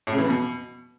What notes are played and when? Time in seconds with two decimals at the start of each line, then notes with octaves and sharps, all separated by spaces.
0.07 A2
0.13 C#3
0.18 E3
0.24 F2
0.30 B2